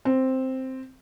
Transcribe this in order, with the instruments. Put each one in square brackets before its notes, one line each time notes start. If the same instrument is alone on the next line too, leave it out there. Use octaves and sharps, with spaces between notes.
[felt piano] C4